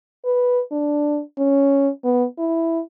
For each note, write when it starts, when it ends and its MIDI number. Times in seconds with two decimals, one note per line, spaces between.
0.25 0.62 71
0.72 1.21 62
1.38 1.90 61
2.04 2.26 59
2.39 2.81 64